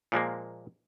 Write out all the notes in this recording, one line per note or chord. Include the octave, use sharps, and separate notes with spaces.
A#2 F3 G#3 A#3